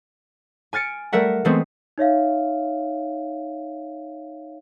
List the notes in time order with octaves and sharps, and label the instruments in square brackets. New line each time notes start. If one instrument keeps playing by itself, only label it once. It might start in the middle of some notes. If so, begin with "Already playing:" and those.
[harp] G#5 F6 A6 C#7 D7
G3 A3 A#4 E5 F#5
E3 G#3 A3 B3 C4
[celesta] D#4 C#5 E5 F5